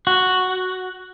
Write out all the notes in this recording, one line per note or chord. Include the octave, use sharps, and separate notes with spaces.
F#4